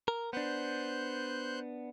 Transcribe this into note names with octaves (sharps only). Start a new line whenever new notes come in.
A#4
B3 D4 C5 F#6 G6